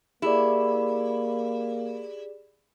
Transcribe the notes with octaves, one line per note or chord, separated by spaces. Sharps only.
A#3 E4 G4 G#4 D5